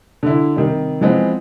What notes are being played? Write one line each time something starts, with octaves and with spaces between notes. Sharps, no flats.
D3 E4
C3 D#3 G3
E3 F3 G#3 B3 C4